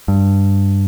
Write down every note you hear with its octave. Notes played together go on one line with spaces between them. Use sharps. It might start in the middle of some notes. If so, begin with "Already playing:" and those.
G2